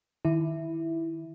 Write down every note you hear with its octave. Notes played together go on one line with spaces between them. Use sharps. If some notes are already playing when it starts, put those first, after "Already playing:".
D#3 E4